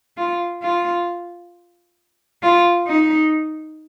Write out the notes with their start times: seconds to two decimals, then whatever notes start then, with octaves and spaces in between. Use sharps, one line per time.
0.17 F4
0.63 F4
2.43 F4
2.87 D#4